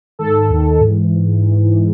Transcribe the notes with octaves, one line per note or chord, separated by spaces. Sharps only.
G#2 D#3 A4
D#2 D#3
G#2 E3